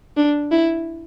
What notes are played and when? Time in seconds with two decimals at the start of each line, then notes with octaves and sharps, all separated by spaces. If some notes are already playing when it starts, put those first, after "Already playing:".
0.17 D4
0.52 E4